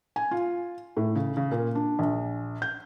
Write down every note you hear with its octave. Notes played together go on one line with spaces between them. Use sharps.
G#5
F4
A2
C#3
C#3
A#2
D4
A#1
G6